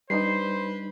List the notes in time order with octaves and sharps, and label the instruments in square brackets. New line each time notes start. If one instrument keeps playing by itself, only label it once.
[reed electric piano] G3 D4 D#4 [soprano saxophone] B4 [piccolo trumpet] C5 [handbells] C7